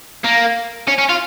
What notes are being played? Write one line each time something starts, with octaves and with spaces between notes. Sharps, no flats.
A#3
C#4
C#4
F4